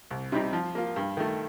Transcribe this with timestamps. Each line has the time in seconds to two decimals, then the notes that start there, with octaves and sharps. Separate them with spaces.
0.11 C2
0.32 C3 G3 C4 D#4
0.53 F3
0.75 A#3 F4
0.96 G2
1.17 D#3 A3